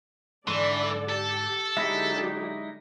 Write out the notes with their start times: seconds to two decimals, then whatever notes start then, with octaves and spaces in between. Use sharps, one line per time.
0.48 G#2 D3 E3 A4 D5 C6
1.09 G4 A4 A5
1.77 D3 F#3 G#3 D#4 E4 G4 E5 B5